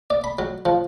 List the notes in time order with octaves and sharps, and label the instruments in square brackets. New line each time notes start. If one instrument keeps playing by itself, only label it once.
[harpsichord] D5
B5
F#3
F3